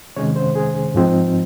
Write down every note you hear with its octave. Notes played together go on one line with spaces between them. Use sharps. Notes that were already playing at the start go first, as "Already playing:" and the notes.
C3 D#3 G#3 C#4 C#5
C5
G#4
G#2 F3 C4 D#4